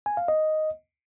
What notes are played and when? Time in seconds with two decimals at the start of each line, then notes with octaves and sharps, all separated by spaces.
0.06 G#5
0.17 F5
0.28 D#5